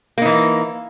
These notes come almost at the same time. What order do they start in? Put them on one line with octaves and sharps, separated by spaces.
A#3 D#4 E3